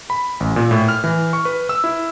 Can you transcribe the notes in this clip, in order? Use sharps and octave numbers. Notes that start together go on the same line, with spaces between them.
B5
A1
A#2
A2
F6
E3
C#6
B4
E6
E4